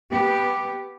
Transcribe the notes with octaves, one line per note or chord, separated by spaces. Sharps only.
B3 G4